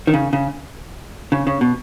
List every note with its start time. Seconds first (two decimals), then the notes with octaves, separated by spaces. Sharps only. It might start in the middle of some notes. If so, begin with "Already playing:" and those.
0.07 D#3
0.14 C#3
0.33 C#3
1.32 C#3
1.47 C#3
1.61 B2